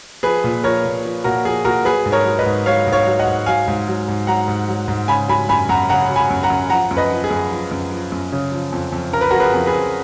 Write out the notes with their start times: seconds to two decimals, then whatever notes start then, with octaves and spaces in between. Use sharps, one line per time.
0.23 F3 G#4 B4
0.44 A#2
0.63 F3 A#4 C#5
0.85 A#2
1.05 F3
1.24 A#2 F#4 A#4
1.45 F3 G#4
1.65 A#2 F#4 A#4
1.85 F#3 G#4 B4
2.06 G#2
2.12 A#4 C#5
2.26 F#3
2.39 B4 D#5
2.46 G#2
2.66 F#3 C#5 F5
2.87 G#2
2.92 C#5 F5
3.07 F#3
3.19 D#5 F#5
3.27 G#2
3.46 F#3 F5 G#5
3.68 G#2
3.88 F#3
4.08 G#2
4.27 F#3 F#5 A#5
4.48 G#2
4.69 F#3
4.88 G#2
5.08 C#3 G#5 B5
5.28 F#3 G#5 B5
5.49 F#2 G#5 B5
5.69 F#2 F#5 A#5
5.89 C#3 F#5 A#5
6.09 F#3
6.16 G#5 B5
6.30 F#2
6.43 F#5 A#5
6.50 F#2
6.70 F3 F#5 A#5
6.91 F#2
6.97 B4 D#5
7.11 F3
7.24 G#4
7.30 F#2
7.51 F3
7.71 F#2
7.92 F3
8.12 F#2
8.32 C#3
8.52 F3
8.72 F2
8.92 F2
9.13 C#3 A#4
9.21 B4
9.31 F3 F#4 A#4
9.40 G#4 B4
9.54 F2
9.66 G#4 B4
9.73 F2